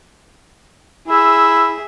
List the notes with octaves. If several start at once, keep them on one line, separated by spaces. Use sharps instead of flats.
E4 G#4 E5